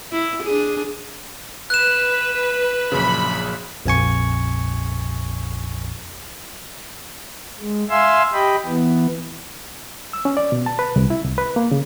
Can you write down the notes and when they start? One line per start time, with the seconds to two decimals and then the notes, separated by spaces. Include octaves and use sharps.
0.12 E4
0.43 D4 G#4
1.70 B4 F#6 E7
2.92 A#1 F#2 C#3 B5
3.85 A#1 F2 G#5 C#6
7.60 G#3
7.90 E5 F5 G#5 C6 E6
8.33 G4 D#5 G5 B5
8.65 E3 B3
10.13 E6
10.25 C#4
10.37 D5
10.52 B2
10.66 A5
10.79 B4
10.96 C2
11.10 E4
11.25 C2
11.38 B4
11.56 A#3
11.71 C#3